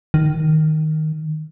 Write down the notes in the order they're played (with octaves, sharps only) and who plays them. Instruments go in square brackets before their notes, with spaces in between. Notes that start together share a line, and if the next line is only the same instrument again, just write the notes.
[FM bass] D#3